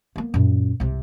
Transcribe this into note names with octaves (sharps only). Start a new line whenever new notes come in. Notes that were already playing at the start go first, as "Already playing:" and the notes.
A#3 B3
F#2 A#2
C2 C3